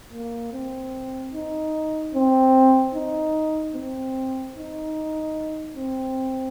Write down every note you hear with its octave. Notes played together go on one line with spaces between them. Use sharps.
A#3
C4
D#4
C4
D#4
C4
D#4
C4